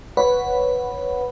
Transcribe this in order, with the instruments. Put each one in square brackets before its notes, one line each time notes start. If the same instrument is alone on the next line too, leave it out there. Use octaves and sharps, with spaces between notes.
[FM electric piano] B4 C#5 F#5 B5